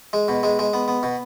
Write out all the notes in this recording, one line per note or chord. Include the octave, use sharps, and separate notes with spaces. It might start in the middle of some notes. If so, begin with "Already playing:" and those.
G#3
B2
G#3
G#3
B3
B3
B2